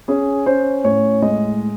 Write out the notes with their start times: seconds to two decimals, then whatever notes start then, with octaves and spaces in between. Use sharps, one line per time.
0.08 C#4 G#4
0.46 C#4 C5
0.84 A2 C#5
1.22 G#3 D#5